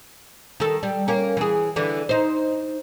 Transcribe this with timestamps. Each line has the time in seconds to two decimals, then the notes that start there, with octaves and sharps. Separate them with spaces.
0.60 D#3 A4
0.83 G3
1.08 A#3 C#4
1.37 E3 G#4
1.76 D3 E3
2.09 D#4 C5